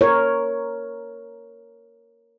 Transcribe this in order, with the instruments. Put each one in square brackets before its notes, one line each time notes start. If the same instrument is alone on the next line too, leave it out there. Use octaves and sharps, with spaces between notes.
[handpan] A#4 C#5